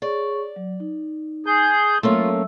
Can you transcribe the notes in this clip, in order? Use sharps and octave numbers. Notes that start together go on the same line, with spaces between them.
G#4 C#5 D5 C#6
F#3
D#4
G#4 G6
F#3 A3 A#3 C#4 F4 E5 E6